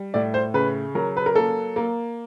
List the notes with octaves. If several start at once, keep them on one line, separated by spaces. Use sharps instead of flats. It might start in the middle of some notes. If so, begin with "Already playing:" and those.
Already playing: G3
A2 D5
C5
C#3 B4
F#3 A#4
B4
A#4
A#3 A4
A#3